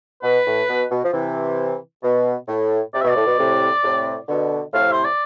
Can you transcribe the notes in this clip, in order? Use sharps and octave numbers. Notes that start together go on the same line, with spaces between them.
B2 B4
A2
B2
B2
F3
C3 E3
B2
A2
C3 D5
E5
B2
D5
A2
B2
A2 C3
A2 C3
B2 D3
A2 C3 F5
C5
D5